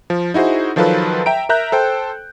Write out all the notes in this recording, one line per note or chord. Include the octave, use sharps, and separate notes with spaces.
F3
D#4 E4 F#4 G#4 C5
D#3 F3 F#3 F4 A4 B4
E5 G5 A#5 D7
A#4 E5 A#5 F#6 G6
A4 C5 G5